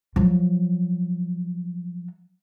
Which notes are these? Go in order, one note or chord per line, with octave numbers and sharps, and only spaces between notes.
F3 F#3